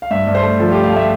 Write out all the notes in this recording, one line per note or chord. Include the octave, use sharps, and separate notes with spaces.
F5
G2 E5
G2
C5
A3
F3 A4
F4
A3 G4
F5
A3 E5